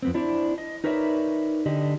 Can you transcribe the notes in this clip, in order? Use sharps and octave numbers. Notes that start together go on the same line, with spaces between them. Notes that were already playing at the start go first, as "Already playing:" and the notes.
F2 B3 C4
D4 E4 C5 D5
D#5
D#4 A#4 B4 C#5 D5 E5
D3 G4 D5 D#5